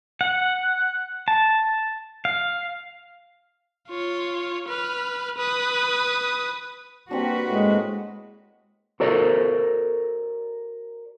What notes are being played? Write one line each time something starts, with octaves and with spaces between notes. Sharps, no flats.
F#5
A5
F5
F4 C#5
B4 F6
B4 D#6
G3 A#3 C4 D4 F#4 B4
A2 G#3
F#4 A4 A#4 C5 D5